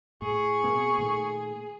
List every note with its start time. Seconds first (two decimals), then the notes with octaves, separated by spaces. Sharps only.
0.22 A2 G#4 C#6
0.63 B2 A#3 C4
0.98 A#2 D#3 A3